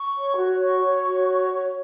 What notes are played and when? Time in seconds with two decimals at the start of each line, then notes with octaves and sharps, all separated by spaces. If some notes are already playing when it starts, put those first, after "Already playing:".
Already playing: C#6
0.15 C#5
0.37 F#4
0.59 C#5 C#6
0.82 C#5
1.05 F#4
1.27 C#5
1.50 C#5